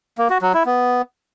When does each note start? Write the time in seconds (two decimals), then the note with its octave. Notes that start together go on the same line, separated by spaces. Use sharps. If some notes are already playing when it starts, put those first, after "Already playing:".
0.18 A#3
0.30 F#4
0.42 F#3
0.54 E4
0.66 B3